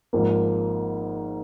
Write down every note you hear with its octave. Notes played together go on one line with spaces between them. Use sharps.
G#1 G#2 F3 A#3